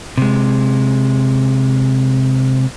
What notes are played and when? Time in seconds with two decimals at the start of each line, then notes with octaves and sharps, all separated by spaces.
0.17 C3 G#3